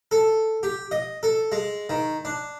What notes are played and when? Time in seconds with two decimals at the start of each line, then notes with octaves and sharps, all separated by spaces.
0.11 A4
0.63 G4
0.91 D#5
1.23 A4
1.52 G#3
1.90 D#3
2.25 D4